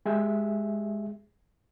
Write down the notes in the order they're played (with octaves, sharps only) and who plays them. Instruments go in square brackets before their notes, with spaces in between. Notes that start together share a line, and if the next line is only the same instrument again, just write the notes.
[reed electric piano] G#3 G4 G#4 E5